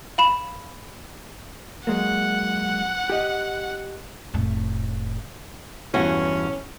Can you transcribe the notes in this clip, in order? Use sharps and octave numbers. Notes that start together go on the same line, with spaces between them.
F5 B5 E7
F#3 G#3 A#3 F#5
G4 D#5
F1 A2
E2 G2 C#4 F#4